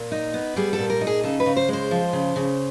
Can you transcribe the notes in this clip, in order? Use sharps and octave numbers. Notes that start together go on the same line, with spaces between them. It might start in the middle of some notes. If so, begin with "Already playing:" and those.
Already playing: A#2
D#4
B3
G3 G#4
A4
A#2
A#4
D#4
G#4
C#3 A4
B4
C#3
C5
G#3 C5
F3
C#3
C#3